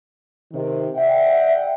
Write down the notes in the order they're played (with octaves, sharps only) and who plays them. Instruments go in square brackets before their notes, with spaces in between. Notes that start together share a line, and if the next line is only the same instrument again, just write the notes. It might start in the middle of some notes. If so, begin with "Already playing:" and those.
[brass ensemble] C3 D#3
[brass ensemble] D5 F#5 G5 [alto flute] E5